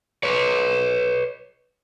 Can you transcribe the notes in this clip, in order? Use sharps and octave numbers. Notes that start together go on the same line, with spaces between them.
B4 C#5